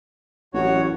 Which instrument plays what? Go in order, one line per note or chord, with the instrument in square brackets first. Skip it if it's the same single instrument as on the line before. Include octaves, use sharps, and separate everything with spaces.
[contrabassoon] A1 [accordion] F#2 F#4 C#5